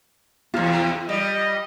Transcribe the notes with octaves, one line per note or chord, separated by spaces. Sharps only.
E2 C3 F4
G3 D#5